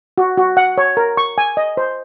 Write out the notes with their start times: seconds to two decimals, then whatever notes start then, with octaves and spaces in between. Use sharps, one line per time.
0.18 F#4
0.38 F#4
0.57 F#5
0.78 C#5
0.97 A#4
1.17 C#6
1.38 G#5
1.57 D#5
1.77 C5